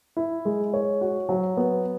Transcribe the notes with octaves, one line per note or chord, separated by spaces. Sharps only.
E4
G#3
C#5
F#4
F#3
B3